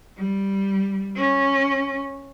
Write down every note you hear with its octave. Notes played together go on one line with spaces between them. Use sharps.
G3
C#4